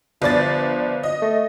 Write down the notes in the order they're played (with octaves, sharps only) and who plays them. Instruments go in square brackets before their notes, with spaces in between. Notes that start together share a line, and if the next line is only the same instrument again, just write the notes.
[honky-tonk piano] G1 D5 A6 [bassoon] F3
[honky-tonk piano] D#5
[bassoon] A3